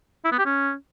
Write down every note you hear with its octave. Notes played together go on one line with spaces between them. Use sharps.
E4
B3
G4
C#4